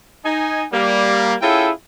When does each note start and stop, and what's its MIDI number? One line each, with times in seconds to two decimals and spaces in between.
0.25 0.64 63
0.25 0.64 80
0.73 1.34 55
0.73 1.34 58
1.42 1.70 61
1.42 1.70 64
1.42 1.70 65
1.42 1.70 68
1.42 1.70 69
1.42 1.70 79